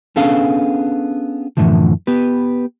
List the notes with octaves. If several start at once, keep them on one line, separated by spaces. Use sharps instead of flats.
B3 C#4 D4 G#4 A4 F5
F#2 A2 D3 E3 F3
B3 G4 B4